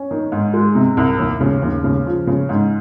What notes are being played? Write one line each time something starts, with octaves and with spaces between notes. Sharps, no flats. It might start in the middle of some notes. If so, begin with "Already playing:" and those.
Already playing: C#4
D#3
G#2
G#3
C3
C2
D#2
C#3
D#2
C#3
F3
C#3
G#2